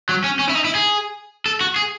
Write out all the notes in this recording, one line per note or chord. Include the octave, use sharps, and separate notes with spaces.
F#3
C#4
C#4
E4
D#4
E4
G#4
A4
F#4
G#4